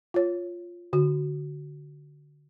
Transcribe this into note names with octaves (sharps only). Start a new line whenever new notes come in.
F4 C#5
D3 F#4